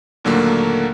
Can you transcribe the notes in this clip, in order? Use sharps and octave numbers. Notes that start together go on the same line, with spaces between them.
D#2 A#2 D3 F#3 A3 A#3